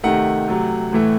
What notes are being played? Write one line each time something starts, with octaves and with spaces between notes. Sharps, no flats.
C3 D#3 A3 F#5
C3 F#3 A3
A2 E3 A3